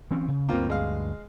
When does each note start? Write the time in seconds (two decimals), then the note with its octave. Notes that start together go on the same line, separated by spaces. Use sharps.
0.11 E3 C4 C#4
0.28 C#3
0.49 D2 G2 A#3 C4 F4
0.70 G#3 F5